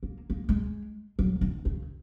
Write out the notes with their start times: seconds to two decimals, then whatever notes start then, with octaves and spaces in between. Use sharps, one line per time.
0.03 A#3
0.30 A#3
0.49 G#3
1.19 F#3
1.41 D#3
1.65 C#3